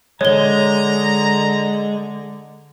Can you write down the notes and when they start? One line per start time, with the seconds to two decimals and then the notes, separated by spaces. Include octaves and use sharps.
0.21 D3 G#3 C#5 A#5 G7